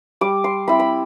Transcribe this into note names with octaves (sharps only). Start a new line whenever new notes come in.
G3 D6
C6
C4 E4 B5
B5